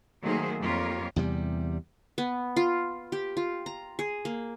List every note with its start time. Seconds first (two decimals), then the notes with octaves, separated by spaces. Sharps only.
0.22 D#3 F#3 A3 A#3 G#4 C5
0.60 F2 A#3 F4 G4 A#4 C#5
1.16 E2 C3 G3
2.18 B3
2.56 F4
3.12 G4
3.37 F4
3.66 A#5
3.99 G#4
4.25 A#3